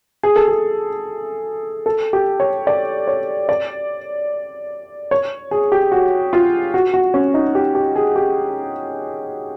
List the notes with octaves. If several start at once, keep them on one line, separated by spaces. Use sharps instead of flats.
G#4
A4
G#4
A4
G4
C#5
D5
C#5
D5
C#5
G#4
G4
F#4
F4
F#4
F#4
C#4
D#4
G4
G4
G#4
G4